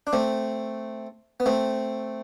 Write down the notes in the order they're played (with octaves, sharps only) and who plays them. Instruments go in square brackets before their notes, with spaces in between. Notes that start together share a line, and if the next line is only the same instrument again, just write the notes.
[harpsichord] D4
A3 C4
B3
A3 C4